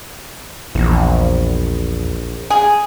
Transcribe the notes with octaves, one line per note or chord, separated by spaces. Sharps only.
A#1 E2
G#4